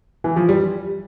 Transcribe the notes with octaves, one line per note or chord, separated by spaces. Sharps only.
E3
F3
G3